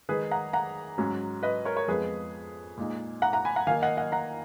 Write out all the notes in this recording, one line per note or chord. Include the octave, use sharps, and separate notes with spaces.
D#3 G#3 D#4 G#4 B4
F#5 A#5
F#5 A#5
G#2 F#3 C#4
B4 D#5
A#4 C#5
A#4 C#5
F2 F3 G#3 B3 G#4 B4
A#2 G#3 D#4
F#5 A#5
F#5 A#5
G#5 B5
F#5 A#5
D#3 A#3 D#4 F5 G#5
D#5 F#5
D#5 F#5
F#5 A#5